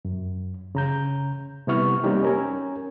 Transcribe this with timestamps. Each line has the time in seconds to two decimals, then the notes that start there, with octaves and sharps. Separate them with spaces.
0.05 F#2
0.75 C#3 A#5 G6
1.67 C3 G3 B3 E4 C#6 F6
2.04 G3 A#3 C4 C#4 D#4 G4
2.23 C#4 A#4 G#5